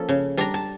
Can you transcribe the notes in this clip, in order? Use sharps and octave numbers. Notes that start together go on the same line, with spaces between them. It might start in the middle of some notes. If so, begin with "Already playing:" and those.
Already playing: F3 A#3 C#4 A4
C#3
G3 D4 A#5
A5